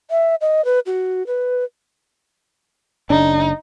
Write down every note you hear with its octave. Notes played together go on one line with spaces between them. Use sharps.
E5
D#5
B4
F#4
B4
F#1 C#3 D4 D#4